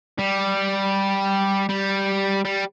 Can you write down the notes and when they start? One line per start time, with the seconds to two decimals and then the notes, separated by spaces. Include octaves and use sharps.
0.19 G3
1.69 G3
2.45 G3